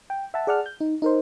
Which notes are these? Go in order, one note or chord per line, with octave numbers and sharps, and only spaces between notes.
G5
E5 F#5 A5
G#4 D5 F#5 A5 F6
G6
D#4
D#4 A#4 C5